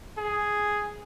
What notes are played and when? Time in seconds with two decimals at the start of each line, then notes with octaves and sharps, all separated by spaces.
0.18 G#4